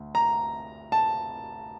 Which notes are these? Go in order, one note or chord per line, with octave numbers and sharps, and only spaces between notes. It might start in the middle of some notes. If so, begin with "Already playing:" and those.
Already playing: D2
A#5
A5